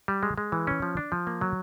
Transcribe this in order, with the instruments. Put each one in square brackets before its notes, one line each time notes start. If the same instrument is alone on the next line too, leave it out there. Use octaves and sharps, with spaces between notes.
[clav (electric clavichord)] G3
G#3
G#3
E3
C#4
F3
D4
F3
A#3
F#3